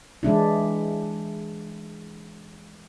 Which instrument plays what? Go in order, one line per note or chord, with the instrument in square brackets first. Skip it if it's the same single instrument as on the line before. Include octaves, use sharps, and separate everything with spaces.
[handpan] E3 G#3 D4 E4